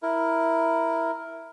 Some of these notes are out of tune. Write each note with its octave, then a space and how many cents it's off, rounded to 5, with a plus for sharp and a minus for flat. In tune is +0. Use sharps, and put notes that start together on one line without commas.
E4 +0 A#4 +0